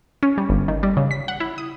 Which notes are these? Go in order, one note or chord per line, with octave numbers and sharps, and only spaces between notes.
C#4
G3
G1
D#3
G3
C#3
B6
F#5
E4
D#6